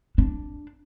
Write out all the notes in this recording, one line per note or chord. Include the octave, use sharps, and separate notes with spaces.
D4